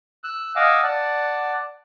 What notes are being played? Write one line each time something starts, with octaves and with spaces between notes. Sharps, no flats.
E6 F#6
D#5 F5 F#5 G#5 D6 E6
D5 F#5 A5